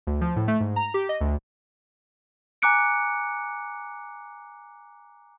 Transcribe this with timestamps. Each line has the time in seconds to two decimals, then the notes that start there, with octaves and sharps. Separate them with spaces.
0.07 D2
0.21 F3
0.36 A2
0.48 A3
0.60 G#2
0.76 A#5
0.94 G4
1.09 D#5
1.21 D2
2.62 G#5 A#5 D6 F#6 C#7 D7